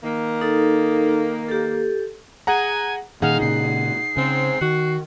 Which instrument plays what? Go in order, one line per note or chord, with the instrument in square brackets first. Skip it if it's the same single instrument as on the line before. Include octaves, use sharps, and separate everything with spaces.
[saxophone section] D#3 A#3
[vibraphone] D#4 A4
G4 A4
[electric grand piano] G#4 F#5 A#5 [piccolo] G#5
[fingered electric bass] A#2 D#3 [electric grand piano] D#4 G#4 F#5 [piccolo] F5
[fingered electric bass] A#2 C#3 [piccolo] C7
[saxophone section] G#2 C4 [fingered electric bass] C#3
[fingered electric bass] D#3 [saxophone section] F#4